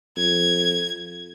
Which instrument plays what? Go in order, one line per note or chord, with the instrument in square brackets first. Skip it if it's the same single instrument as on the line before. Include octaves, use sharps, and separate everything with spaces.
[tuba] F2 [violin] G#6